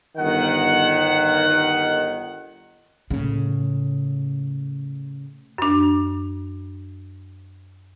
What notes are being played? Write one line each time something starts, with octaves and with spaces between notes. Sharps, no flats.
G1 D#3 F#5
A2 C#3
F#2 D4